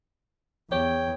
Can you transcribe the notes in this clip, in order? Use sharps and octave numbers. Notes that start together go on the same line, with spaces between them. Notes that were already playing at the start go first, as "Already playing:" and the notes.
E2 C#5 G5